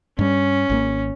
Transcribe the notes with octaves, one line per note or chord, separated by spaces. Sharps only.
G2 G3 C#4
G#1 D#3 A#3